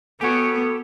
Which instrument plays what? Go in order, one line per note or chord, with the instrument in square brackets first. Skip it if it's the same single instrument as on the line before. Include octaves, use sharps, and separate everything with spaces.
[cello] B3 [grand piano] F#4 G#5 [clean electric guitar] G4 C#5 [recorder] A4